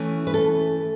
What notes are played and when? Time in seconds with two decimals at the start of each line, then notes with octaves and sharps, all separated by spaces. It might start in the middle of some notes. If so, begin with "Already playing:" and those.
Already playing: E3 A3 C#4
0.27 B4
0.34 A4